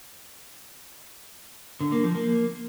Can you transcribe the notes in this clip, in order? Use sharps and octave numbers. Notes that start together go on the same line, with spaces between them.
D3
A#3
F3
A#3